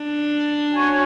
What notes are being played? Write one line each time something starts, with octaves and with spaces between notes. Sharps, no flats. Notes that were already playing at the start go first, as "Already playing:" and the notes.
Already playing: D4
F#4 C#5 G#5 C#6